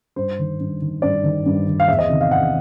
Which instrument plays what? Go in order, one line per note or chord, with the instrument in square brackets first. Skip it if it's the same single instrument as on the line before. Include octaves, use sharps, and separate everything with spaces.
[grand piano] G2 C5
D#3
G2
D#3
G2 D5
D#3
G2
D#3
F5
E2 E5
D#5
C3 D#3
F5
E2 F#5